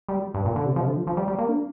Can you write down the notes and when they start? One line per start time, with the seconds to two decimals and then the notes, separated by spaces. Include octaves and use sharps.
0.09 G3
0.34 G2
0.45 A#2
0.56 D3
0.66 C3
0.76 F3
0.81 C3
0.87 D3
0.97 F3
1.07 F3
1.17 G3
1.28 G3
1.39 A#3
1.49 D4